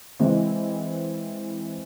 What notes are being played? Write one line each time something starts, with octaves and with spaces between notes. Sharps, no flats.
E3 G#3 C4 E4